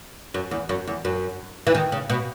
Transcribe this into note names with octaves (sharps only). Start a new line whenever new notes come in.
F#2
E2
F#2
E2
F#2
E3
D#3
C#3
B2